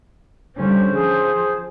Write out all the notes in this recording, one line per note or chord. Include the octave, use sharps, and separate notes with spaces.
D3 G3 C#4 C5
F3 G#4